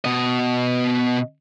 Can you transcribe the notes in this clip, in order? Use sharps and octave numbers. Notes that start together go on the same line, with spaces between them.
B2 D#5